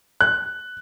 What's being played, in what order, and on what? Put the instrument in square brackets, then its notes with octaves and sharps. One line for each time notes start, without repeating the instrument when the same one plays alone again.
[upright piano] F#6